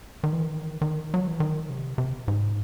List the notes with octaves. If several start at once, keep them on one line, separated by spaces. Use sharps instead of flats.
D#3
E3
D#3
D#3
F#3
E3
D#3
C3
C3
G#2